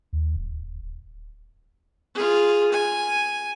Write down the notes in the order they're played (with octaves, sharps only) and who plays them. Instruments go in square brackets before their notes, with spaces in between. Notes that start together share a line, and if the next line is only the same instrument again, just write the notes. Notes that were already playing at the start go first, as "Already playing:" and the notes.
[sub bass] D#2
D1
[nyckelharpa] F4 G#4
G#5